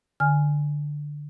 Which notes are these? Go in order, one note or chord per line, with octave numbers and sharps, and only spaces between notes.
D3 G#5 F6